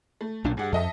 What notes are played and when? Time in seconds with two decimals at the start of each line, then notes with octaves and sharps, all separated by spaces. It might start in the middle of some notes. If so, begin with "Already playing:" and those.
0.21 A3
0.44 B1 A#2 D4
0.57 G2 G#4 F#5
0.72 F2 A4 D#5 E5